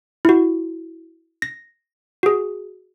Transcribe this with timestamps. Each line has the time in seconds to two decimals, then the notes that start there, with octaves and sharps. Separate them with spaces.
0.25 E4 F#4
1.42 A#6
2.23 F#4 G#4